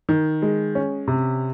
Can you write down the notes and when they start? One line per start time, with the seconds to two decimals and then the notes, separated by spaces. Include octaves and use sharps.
0.09 D#3
0.42 G#3
0.75 C#4
1.08 C3